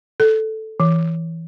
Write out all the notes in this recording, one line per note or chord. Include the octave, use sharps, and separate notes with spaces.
A4
E3